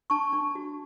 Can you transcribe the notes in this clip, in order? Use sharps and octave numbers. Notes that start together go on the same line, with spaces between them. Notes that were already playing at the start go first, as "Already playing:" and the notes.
D4 A5 C#6
D4
F#4